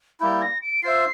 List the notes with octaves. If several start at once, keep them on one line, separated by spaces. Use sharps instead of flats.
G3 A#3 E4 G6
A#6
D7
F4 C5 E5 C7